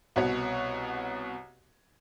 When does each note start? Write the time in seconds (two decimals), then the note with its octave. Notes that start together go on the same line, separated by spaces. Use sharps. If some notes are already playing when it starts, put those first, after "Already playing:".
0.16 C2 B2 F#4 C#5